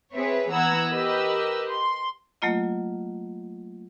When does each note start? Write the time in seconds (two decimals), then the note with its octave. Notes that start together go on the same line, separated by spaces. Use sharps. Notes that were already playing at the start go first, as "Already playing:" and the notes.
0.12 C4 G#4 B4 C#5 E5
0.51 E3 B3 F#5 A#5 E6 G#6
0.91 G4 A#4 B4 D#5 E6
1.70 C6
2.42 F#3 A3 A#3 F4 D#5